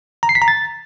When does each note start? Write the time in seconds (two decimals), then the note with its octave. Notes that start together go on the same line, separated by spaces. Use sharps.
0.23 A#5
0.29 C7
0.35 B6
0.42 A#5
0.48 A6